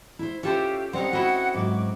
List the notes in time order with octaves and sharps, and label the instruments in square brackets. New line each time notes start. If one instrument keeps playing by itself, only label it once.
[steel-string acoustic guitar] E4 C5
[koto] C#4 A4 C5 [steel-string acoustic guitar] F4 C#5 E5 [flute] G4
[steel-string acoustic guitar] G3 [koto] C4 C#4 D#4 [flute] F#5
[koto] E4 D#5 [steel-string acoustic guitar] F#4
[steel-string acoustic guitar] G#2 F#3 F#4 [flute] D6